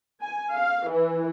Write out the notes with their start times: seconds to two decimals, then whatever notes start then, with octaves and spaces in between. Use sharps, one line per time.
0.21 G#5
0.52 F5
0.90 E3